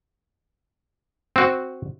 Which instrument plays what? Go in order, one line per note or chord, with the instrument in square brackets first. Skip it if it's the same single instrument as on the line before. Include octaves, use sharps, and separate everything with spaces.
[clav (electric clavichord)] C4 F#4